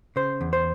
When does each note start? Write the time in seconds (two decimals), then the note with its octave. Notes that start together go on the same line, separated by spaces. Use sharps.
0.16 C#3 C5
0.41 E2
0.53 C5